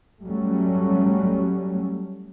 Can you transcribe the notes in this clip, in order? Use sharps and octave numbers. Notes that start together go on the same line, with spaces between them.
F#3 G3 A3 C#4